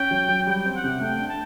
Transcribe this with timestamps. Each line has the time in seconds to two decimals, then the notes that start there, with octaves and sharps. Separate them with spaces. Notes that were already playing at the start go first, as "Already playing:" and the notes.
Already playing: C#4 G5
0.11 F#3
0.29 F#3
0.47 G3 G5
0.66 C4
0.75 F#5
0.84 C3
1.01 A3 G5
1.19 D4
1.28 A5